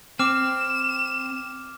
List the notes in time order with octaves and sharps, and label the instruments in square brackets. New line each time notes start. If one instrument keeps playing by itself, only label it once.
[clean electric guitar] C4 [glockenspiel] D6 F6 [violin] E7